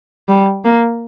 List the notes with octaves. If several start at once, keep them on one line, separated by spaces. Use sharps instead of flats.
G3
A#3